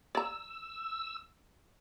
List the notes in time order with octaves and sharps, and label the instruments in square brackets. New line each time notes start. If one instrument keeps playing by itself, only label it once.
[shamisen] D5 A#5 [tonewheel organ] E6